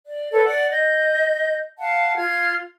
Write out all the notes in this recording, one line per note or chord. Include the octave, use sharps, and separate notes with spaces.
D5
A4 B4 C#5
D5 F#5
D#5 G6
F5 F#5 A5
F4 F6 G#6